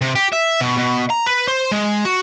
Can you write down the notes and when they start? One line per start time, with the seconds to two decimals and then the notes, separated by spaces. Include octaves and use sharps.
0.01 C3
0.15 G4
0.32 E5
0.60 B2
0.77 B2
1.10 A#5
1.26 B4
1.48 C5
1.72 G#3
2.05 F#4